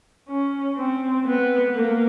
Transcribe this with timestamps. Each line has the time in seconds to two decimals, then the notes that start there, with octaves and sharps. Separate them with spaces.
0.28 C#4
0.77 C4
1.26 B3
1.75 A#3